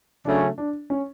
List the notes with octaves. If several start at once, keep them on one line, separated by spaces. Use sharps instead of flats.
C#3 F#3 A3 C#4 D4
D4
C#4